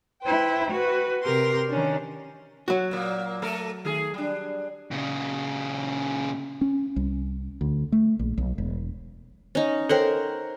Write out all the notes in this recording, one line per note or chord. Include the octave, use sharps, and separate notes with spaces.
E4 B4 C5 G5
F#4 B4
C3 G4 A#4 C6
D#3 C#4 D4
F#3 F#4
A#2 A#3
A3 A4 A#4
D#3 A3 G#4
G3 D4
A#2 C#3
C#4
C2
D2
A3
A#1
B1
E1
C#4 D#4
A4 A#4 C5 C#5 F#5 G5